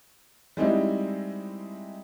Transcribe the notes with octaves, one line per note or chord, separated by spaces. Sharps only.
G3 G#3 C4 D#4 E4